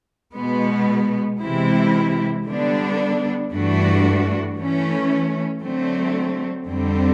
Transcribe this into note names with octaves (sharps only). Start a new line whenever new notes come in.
B2 G#3 B3
C3 E3 G#3 C4 E4
D3 G3 B3 D4
G2 E3 A3 D4 F#4
E3 A3 C#4
D3 F#3 A3 C4
F2 D3 G3 C4